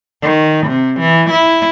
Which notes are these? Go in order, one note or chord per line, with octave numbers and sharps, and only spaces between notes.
D#3
C3
E3
E4